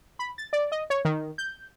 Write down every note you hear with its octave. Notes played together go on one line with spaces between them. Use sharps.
B5
A6
D5
D#5
C#5
D#3
G6